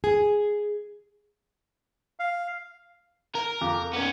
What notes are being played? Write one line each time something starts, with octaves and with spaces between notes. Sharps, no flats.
G#4
F5
A#4
F2 D6
B3 C#4